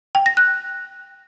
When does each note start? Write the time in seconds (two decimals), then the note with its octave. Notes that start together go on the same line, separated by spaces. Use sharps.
0.15 G5
0.26 A#6
0.37 F#6